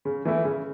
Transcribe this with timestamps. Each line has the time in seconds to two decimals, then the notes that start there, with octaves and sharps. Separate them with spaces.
0.05 C#3
0.25 E3 A3 E4
0.45 C#3